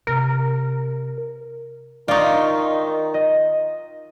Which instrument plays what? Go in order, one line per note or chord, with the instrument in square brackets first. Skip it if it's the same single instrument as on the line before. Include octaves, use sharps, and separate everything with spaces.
[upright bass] C3 [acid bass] A#4
[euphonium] D#3 [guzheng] D#4 F4 [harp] D5 C#6
[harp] D#5